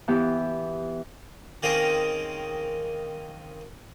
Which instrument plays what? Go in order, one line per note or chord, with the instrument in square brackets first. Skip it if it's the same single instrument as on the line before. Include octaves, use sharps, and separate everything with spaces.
[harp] E3 B3 G4
[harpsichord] D#3 A#3 C4 C#4 G#4 A#4